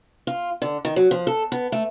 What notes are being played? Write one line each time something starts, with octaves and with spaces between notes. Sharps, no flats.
F4
D3
D#3
F#3
F3
A4
B3
A3